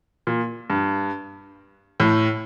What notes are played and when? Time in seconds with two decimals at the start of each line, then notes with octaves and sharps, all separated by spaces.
0.27 A#2
0.70 G2
2.00 A2